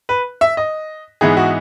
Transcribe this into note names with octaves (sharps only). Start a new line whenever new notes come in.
B4
E5
D#5
G#2 E3 B3 D#4 G#4
F#4